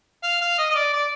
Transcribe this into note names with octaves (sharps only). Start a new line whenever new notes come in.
F5
F5
D#5
D#5
D5
D5